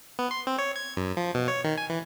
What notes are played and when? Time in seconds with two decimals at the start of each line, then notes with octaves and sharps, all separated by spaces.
0.19 B3
0.31 C6
0.47 C4
0.59 C#5
0.76 G#6
0.97 F#2
1.17 F3
1.35 B2
1.48 C#5
1.64 D#3
1.78 G#5
1.90 E3